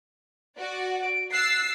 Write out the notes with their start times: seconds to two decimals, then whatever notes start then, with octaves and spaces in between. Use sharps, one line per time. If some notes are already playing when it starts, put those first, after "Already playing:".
0.58 F#4 D5
1.02 D7
1.32 E6 F#6 A6 C7